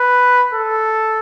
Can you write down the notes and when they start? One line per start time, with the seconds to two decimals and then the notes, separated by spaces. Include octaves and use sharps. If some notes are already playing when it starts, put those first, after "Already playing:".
Already playing: B4
0.54 A4